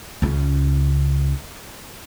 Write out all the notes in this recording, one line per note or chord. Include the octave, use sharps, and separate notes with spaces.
C#2 C#3